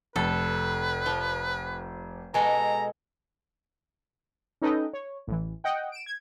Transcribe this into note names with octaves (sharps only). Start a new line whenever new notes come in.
F1 A4 B4
F3
B2 G#3 A4 G#5 A#5
C#4 D#4 A4 B4 D#5 G5
C#5
A1 E3
D#5 F#5 G5
D7 E7
G#6